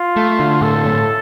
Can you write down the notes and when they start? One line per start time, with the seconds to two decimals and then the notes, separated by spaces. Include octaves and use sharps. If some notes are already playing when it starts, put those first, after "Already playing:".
Already playing: F4
0.16 A3
0.39 D3
0.61 A2 A4
0.86 A2